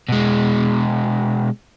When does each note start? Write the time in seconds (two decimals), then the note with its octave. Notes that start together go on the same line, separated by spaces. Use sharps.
0.09 B2 G#3